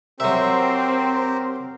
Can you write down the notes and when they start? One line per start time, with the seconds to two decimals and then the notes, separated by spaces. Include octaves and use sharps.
0.20 F#3 C4 G4 A#4 C5 E5